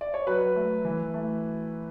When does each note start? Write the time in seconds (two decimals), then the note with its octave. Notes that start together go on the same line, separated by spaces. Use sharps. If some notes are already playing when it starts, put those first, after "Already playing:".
0.01 D5
0.14 C#5
0.27 F#3 B4
0.56 A3
0.85 E3
1.14 A3